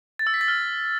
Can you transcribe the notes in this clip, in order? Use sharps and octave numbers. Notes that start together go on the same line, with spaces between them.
A6
E6
B6
A6
F6